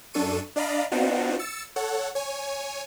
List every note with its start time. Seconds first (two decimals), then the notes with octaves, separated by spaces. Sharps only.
0.14 F#2 D4 A4 C#6 D#7
0.56 D4 D5 D#5 F5 A#5 B5
0.92 B3 C4 D4 D#4 F4 F#4
1.39 E6 A6 C#7
1.76 A4 C#5 F#5
2.15 C#5 G#5